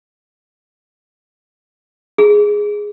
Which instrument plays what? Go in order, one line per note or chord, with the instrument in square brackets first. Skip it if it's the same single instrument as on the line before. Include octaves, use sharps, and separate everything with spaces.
[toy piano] G#4